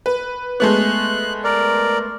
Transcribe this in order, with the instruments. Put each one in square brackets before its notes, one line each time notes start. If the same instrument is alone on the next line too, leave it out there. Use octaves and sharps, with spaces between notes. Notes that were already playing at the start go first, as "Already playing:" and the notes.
[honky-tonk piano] B4
[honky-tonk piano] G#3 A3 B3 [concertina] F#6
[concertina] A#4 D5